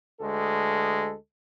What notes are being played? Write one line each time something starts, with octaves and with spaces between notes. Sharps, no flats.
D2 G#3 A4